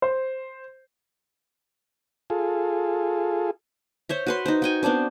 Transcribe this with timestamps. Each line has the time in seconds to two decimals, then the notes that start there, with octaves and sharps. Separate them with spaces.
0.02 C5
2.30 F4 G#4 A4
4.09 C5 C#5 E5
4.27 F#4 B4 C6
4.46 D#4 C5
4.62 F#4 G5 G#5
4.83 B3 C4 D4 C5